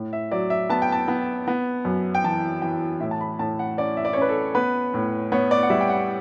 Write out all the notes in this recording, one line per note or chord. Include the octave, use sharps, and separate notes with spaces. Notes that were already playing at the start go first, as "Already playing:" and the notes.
Already playing: A2
E5
F#3 D5
E5
B3 A5
G5
A5
B3
B3
F#2
G5
E3 A5
E3 G5
A2 E5
A5
B5
A2 A5
F#5
C#4 D5
E5
D5
C#5
C#4
B4
A4
B3 B4
A2
B3 C#5
D5
F#5
G3 E5
G5
F#5